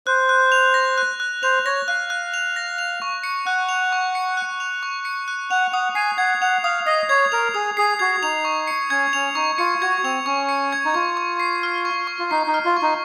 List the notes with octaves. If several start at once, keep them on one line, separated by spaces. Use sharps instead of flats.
C5 F#6
F#6
F7
A#6
F#6
F#6
C5 F7
C#5 A#6
F5 F#6
F#6
F7
A#6
F7
C#6
C#7
F#5 F#6
F7
C#6
C#7
F#6
F7
C#6
C#7
F#6
F#5 F7
F#5 D#6
G#5 C7
F#5 G#6
F#5 F7
F5 D#6
D#5 C7
C#5 G#6
A#4 F7
G#4 D#6
G#4 C7
F#4 G#6
D#4 F7
C#6
C#7
C#4 G#6
C#4 F7
D#4 C#6
F4 C#7
F#4 G#6
C4 F7
C#4 C#6
C#7
G#6
D#4
F4 C#6
C#6
C7
F6
C#6
C#6
F4
D#4 C7
D#4
F6
F4
C#6
D#4